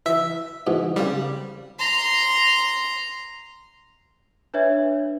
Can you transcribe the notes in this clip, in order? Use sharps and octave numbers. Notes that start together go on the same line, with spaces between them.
E3 E5
G#2 B2 E3
C#3 G3 C4 A#4
A#5 C6
D4 B4 C#5 E5 G#6